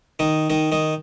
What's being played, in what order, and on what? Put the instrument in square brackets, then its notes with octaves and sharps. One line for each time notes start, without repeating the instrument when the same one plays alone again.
[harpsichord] D#3 D#4
D#3 D#4
D#3 D#4